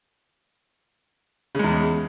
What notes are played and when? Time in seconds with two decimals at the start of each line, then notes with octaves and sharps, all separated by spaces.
1.55 C#3
1.59 G#3
1.64 E2